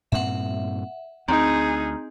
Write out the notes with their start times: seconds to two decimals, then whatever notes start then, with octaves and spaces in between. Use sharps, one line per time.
0.12 G2 A#2 C4 E5 F#5
1.28 D2 C4 D#4 G#4 A#5